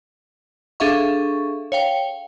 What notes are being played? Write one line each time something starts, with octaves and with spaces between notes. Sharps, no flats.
D4 G#4 A4 E5 F5 C#6
C#5 F5 G5